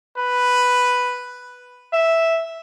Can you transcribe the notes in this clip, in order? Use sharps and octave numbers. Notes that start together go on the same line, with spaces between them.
B4
E5